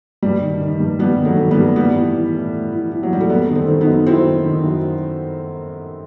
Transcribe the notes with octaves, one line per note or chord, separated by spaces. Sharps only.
G2 G3
D#3
D#3
G2
G2 G3 B3
D#3
F#3 A3
D#3
G3 B3
G2
A2 G3 B3
E3
E3
A2
A2
E3
E3
F#3
A2 G3
A3
F#2 G3 B3
D#3
A3 C4
D#3
B3 D#4
F#2
F#2 C4 E4
D#3
D#3
F#2